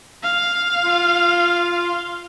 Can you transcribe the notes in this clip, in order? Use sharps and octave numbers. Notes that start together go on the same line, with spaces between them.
F5
F4